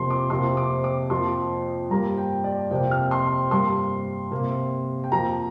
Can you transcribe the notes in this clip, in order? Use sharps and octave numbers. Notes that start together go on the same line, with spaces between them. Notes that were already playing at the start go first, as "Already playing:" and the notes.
Already playing: F2 C3 F3 A#3 C6
D6
F2 C3 F3 A#3 C6
D6
D6
F2 F3 A#3 C6
G2 G3 A#3 A#5
G5
D5
F2 C3 A#3 G5
F6
C6
G2 G3 A#3 C6
C3 A#3
G5
F2 F3 A#3 A#5